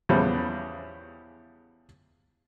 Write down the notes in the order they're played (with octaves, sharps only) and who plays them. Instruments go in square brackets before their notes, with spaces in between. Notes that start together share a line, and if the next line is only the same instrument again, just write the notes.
[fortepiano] E2 C#3 E3 F3 G3 B3